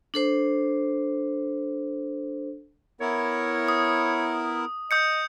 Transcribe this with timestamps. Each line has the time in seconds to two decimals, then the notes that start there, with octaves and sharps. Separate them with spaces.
0.14 D4 A4 C5
3.01 B3 E4 A#4 C#5
3.68 D#6
4.91 D#5 D#6 G6 C#7